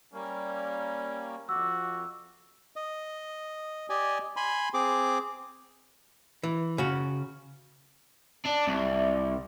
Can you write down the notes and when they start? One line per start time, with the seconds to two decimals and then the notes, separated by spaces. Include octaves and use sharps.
0.13 G3 A#3 C#4
1.49 F2 F#4 D6 E6
2.76 D#5
3.90 G4 D5 D#5 G#5
4.36 G#5 B5 C6
4.74 C4 G#4 D6
6.43 E3
6.78 C#3 F#4
8.45 D4
8.67 C2